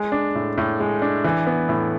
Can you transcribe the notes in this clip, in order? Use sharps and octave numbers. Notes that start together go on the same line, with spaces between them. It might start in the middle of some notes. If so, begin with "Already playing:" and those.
Already playing: G#3
D4
A2
A2
G#3
D4
E3
B3
A2